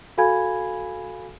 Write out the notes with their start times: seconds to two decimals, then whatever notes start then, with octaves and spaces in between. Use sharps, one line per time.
0.18 F#4 A4 F5 G#5 B5 G#6